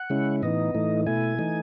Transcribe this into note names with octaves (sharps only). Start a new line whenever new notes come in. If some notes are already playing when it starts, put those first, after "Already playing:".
Already playing: F#5
C#3 G#3 C#4 E4
A2 E3 B3 D#4 D#5
A2 E3 A3 D#4
B2 A3 E4 G#5
E3 A3 D#4